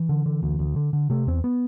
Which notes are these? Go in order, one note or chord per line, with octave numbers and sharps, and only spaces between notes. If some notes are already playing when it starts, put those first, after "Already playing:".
Already playing: E3
D3
D3
D2
D2
D3
D3
C3 A3
E2 C4
B3